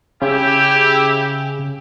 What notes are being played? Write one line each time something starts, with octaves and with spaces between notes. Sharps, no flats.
C#3 E4 G4